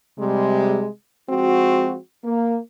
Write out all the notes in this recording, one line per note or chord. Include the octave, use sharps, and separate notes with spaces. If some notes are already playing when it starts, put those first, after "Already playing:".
C3 G3 G#3
F3 G#3 C4 F#4
A#3